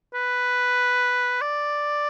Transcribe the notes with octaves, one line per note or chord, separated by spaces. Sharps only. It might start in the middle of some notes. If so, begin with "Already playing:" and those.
B4
D5